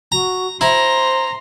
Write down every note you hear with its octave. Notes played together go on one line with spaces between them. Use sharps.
F#4 A#5
E4 C5 A#5 C6